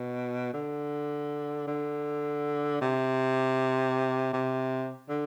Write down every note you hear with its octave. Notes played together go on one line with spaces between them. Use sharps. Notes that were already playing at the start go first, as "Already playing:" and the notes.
Already playing: B2
D3
D3
C3
C3
D3